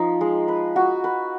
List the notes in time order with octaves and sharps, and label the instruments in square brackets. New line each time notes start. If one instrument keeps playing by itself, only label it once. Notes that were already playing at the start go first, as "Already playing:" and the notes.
Already playing: [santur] F3 D#4
G#3
B4
F#4
B4